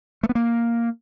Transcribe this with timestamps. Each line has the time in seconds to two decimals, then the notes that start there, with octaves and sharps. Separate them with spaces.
0.23 A3
0.29 B3
0.35 A#3